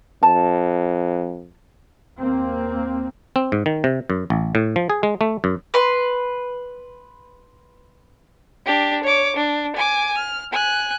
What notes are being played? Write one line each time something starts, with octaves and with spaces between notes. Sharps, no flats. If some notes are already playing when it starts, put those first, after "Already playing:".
F2 A5
D#2 A#3 C4
C4
G#2
D#3
C3
F#2
A1
A2
F3
G#4
G#3
A3
F#2
B4 C6
D4 G4
C#5 D6
D4
G#5 D6
F6
G#5 F#6